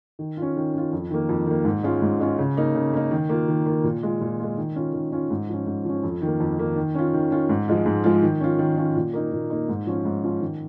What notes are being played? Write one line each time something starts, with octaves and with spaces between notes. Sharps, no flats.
D#3
C#4 F4
D#3
C#4 F4
F2
D#3 A#3
F2
D#3 A#3
G#2
G#3 C#4 F4
G#2
G#3 C#4 F4
C#3
A#3 D#4
C#3
A#3 D#4
D#3
A#3 F4
D#3
A#3 F4
A#2
G#3 F4
A#2
G#3 F4
D#3
C#4 F4
D#3
C#4 F4
G#2
F3 C#4
G#2
F3 C#4
F2
D#3
A#3
F2
D#3 A#3
D#3
C#4 F4
D#3
C#4 F4
G#2
F3 G#3 F4
G#2
F3 G#3 F4
D#3
C#4 F4
D#3
C#4 F4
A#2
A#3 D#4
A#2
A#3 D#4
G#2
F3 C#4 F4
G#2
F3 C#4 F4
D#3